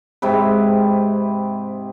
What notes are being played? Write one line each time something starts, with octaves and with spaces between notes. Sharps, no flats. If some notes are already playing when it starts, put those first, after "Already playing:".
G#2 C3 E4 B4